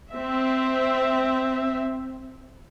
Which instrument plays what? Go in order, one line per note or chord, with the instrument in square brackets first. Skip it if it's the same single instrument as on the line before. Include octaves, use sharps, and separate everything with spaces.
[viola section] C4 E5